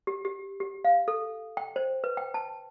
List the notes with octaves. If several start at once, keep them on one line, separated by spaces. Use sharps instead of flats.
G4
G4
G4
F5
A4
G5
C5
B4
G5
A5